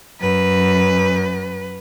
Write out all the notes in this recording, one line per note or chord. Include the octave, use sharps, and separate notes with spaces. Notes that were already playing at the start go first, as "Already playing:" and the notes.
F#2 B4